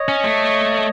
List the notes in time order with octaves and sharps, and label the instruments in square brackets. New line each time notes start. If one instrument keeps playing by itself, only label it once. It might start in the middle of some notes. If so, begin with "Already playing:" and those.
Already playing: [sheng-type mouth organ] C#5 D#5
[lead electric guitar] C#4
A3